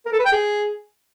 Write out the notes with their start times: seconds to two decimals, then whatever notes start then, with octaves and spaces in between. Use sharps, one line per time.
0.06 A#4
0.12 A4
0.19 B4
0.25 G5
0.32 G#4